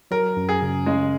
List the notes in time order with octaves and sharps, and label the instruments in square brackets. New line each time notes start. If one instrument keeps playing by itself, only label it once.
[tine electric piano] F#3 [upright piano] A#4
[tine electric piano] F#2
[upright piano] G#4
[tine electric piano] C#3
[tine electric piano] C#3 [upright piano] G#3